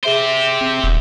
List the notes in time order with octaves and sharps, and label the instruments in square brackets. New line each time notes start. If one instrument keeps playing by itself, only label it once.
[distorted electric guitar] G4 C5 [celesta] G#4 E5 D7
[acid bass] C4
D#1